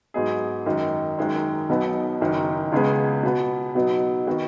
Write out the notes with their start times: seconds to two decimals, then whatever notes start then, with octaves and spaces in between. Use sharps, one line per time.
0.14 G#2 F#3 B3 D#4 G#4
0.66 F#2 D#3 G#3
1.18 F#2 D#3 G#3 D#4
1.69 B1 B2 F#3 B3 D#4
2.21 F#1 F#2 D#3
2.72 C#2 C#3 G#3 B3 G#4
3.23 B2 B3 F#4
3.75 B2 F#3 B3 D#4
4.27 D#3 B3 F#4